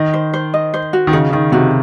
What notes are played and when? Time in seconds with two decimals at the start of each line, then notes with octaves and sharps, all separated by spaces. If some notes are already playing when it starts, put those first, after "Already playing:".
Already playing: D#3 D#5
0.14 C5
0.33 C5
0.54 D#5
0.74 C5
0.93 F#4
1.07 D#3
1.13 C#3 D#4
1.33 D#3 D#4
1.52 C3 F#4